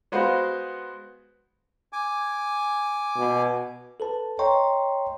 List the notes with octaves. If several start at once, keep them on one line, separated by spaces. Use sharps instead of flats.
G#3 B3 F#4 B4 C5 F5
G#5 D6
B2
A4 B4 A5
C#5 D#5 G5 A#5 C6 C#6